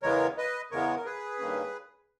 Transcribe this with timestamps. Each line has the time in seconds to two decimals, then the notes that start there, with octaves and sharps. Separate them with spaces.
0.02 E2 C#3 E3 G#3 B3 A#4 C#5
0.37 B4 D#5
0.71 E2 C#3 E3 G#3 B3 A#4 C#5
0.96 A#4
1.05 G#4 B4
1.39 G2 D#3 A#3 C#4